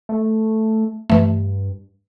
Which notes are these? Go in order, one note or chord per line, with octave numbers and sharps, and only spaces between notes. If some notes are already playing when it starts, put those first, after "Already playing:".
A3
G2 E3 A3